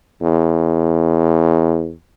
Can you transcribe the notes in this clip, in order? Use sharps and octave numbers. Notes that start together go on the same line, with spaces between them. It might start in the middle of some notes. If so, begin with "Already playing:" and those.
E2